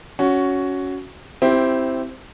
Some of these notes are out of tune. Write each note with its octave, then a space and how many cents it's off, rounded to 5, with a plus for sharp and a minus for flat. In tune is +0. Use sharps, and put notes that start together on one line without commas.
C#4 +10 F#4 +0
C4 +0 E4 +0 G4 -15